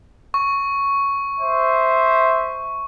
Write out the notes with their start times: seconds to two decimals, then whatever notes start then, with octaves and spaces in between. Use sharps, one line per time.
0.34 C#6
1.40 C5 E5